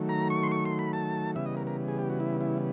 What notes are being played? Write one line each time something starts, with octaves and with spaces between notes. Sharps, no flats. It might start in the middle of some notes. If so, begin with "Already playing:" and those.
Already playing: D#3 F#3 A3
A#5
C#6
C6
C#6
C6
B5
A5
C#3 E3 G3 B3 E5
D#5
A#4
A#4
G#4
G4
F#4
E4
E4